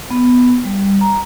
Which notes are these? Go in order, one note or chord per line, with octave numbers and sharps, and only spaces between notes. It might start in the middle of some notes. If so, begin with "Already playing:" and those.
B3
G3
A#5